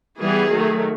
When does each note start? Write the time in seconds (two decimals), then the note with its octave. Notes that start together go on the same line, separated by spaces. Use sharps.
0.20 E3 G3 B3 G#4
0.51 D#3 F#3 A3